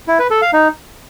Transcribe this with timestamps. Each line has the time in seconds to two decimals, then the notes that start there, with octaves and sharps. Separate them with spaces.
0.08 E4
0.19 B4
0.30 A4
0.42 F5
0.53 D#4